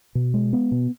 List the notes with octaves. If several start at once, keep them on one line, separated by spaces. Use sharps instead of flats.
B2
G#3
B3
B2